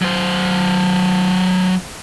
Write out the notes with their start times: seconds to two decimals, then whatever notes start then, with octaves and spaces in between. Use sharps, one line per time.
0.02 F#3 C5